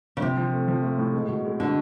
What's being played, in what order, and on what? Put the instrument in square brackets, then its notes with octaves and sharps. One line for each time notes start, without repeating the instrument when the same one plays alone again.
[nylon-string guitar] C#3
[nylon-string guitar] C3 [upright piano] F3
[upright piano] F3
A3
F3
A3
A2
G#3
B2
G#3
[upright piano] B2 [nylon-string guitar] D3